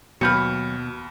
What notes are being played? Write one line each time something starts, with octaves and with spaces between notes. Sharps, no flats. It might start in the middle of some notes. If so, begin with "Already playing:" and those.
D#2 B2 F#3 B4 B5 F6 G6 C#7